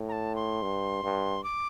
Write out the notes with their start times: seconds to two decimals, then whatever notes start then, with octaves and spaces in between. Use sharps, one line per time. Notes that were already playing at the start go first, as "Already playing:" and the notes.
Already playing: A2
0.09 A#5
0.12 A5
0.36 C6
0.62 G2
1.04 G2
1.44 D6